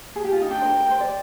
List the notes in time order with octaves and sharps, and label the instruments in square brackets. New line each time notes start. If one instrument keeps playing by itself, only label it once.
[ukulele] G#4
G4
F4
D#4
[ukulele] D4 [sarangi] G5
[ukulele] C5
A#4
A#4
C5
D5